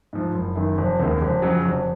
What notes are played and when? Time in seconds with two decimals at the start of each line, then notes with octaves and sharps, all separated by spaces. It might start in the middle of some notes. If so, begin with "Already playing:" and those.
0.13 G#2 F3
0.35 F#1
0.56 F#2 D#3
0.78 F1
1.00 D#2 C#3 G#3
1.21 F1
1.42 F2 C#3 F#3
1.64 F1